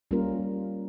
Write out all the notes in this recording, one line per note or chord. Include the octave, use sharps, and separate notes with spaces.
G3 A#3 C#4 F4 A#4